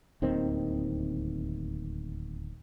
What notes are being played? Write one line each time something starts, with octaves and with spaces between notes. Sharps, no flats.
D1 D#2 D#3 C4